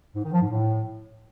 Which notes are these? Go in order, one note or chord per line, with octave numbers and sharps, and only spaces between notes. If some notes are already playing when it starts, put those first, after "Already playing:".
G#2
D#3
F3
G#2
A2